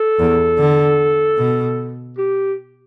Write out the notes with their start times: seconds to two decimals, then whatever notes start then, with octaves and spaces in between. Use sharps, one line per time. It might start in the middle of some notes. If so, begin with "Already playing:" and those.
Already playing: A4
0.19 E2
0.58 D3
1.38 B2
2.18 G4